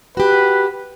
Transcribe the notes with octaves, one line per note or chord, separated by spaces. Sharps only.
F#4 G4 B4